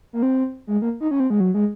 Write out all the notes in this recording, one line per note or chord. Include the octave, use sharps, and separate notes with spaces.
A#3
C4
G#3
A#3
D#4
C#4
C4
G#3
F#3
G#3